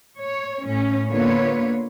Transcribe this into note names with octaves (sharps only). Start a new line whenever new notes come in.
C#5
A2 C#4
D3 A#3 B3 F4 B4 C#5